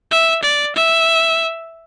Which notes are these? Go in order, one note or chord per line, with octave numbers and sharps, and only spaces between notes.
E5
D5
E5